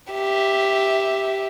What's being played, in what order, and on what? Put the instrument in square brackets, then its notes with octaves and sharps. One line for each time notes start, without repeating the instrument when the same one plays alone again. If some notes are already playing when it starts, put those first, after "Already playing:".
[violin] G4 E5